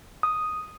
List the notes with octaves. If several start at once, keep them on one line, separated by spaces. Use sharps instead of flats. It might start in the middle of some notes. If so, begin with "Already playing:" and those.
D#6